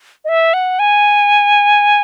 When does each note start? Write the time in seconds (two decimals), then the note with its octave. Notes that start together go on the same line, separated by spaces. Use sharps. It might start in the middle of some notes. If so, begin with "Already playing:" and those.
0.25 D#5
0.29 E5
0.54 F#5
0.79 G#5